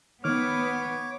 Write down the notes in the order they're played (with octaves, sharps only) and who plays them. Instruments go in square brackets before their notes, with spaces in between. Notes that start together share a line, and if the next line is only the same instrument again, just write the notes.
[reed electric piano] D#3 F6 [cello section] B3 [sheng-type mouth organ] C#5 D6